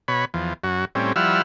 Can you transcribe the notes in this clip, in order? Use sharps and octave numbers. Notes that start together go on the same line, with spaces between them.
B2 C#5 B5
E2 F3
F#2 F#4
A2 G3 C4 C#4
F3 G3 E4 F#5 E6 F6